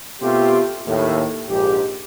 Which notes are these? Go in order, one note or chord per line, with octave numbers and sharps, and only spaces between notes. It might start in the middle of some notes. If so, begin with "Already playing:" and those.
B2 A3 C4 F4 G4
D#2 A2
A#1 G#2 G4